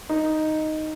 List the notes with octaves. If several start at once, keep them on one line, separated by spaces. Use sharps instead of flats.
D#4